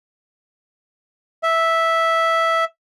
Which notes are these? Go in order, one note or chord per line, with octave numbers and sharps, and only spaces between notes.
E5